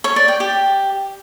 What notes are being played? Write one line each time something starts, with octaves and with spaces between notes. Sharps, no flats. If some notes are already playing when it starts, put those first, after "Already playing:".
C#5
D5
G5
G4